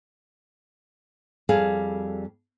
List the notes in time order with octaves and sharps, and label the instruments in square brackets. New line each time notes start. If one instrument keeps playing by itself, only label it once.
[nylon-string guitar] F2 G3 G#4 A4 F5